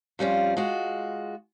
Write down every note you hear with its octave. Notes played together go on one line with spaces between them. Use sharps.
F2 G3 C#4 F4
G#3 F4 F#4